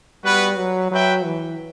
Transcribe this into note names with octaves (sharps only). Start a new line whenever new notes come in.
G3 B3 F#4 B4
F#3
F#3 F#4 B4 E5 G5
E3